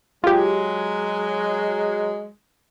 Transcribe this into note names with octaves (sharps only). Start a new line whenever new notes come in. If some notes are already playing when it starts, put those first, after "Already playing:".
F#3 G#3 F4 G4